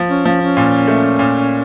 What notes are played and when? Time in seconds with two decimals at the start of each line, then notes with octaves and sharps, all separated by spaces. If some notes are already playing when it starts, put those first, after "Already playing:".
Already playing: F3
0.10 C#4
0.25 F3 C#4
0.41 C#4
0.57 A#2
0.88 A3
1.19 A#2